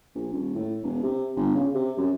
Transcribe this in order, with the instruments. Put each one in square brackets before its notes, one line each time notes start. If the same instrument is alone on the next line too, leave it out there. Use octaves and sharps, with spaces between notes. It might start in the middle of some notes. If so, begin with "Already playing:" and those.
[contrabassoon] A#1
D#1
A2
E1
C3
G1
C#3
C3
F#2